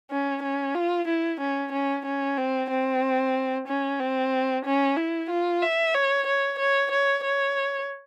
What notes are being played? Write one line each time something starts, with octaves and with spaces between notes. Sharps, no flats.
C#4
C#4
F4
E4
C#4
C#4
C#4
C4
C4
C#4
C4
C#4
E4
F4
E5
C#5
C#5
C#5
C#5
C#5